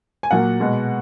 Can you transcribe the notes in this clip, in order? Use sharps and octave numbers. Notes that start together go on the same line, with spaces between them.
G#5
A#2 F#3 A#3 F#5
B2 G#3 B3